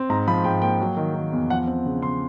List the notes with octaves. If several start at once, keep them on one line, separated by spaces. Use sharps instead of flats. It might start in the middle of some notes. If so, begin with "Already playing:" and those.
Already playing: C4
G#2 A#5
F3 B5
G#2 G5
A#3 G5
F#3
D#3
D#3
E2
F3 F#5
C4
C#3
C#3 C6